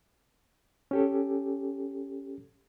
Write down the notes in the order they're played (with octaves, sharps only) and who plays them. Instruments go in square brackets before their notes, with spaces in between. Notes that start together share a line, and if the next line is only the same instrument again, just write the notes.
[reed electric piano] C#4 G4 A4